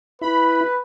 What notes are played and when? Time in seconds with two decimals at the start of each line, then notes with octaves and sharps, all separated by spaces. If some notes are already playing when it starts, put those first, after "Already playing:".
0.22 E4 B4 B5